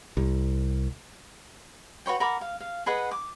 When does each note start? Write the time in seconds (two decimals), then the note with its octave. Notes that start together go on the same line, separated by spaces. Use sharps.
0.17 C2
2.06 F#4 B4 C#5 G5
2.20 A#4 F#5 B5 D6
2.41 F5
2.60 F5
2.86 G#4 B4 D#5 F#5
3.11 D6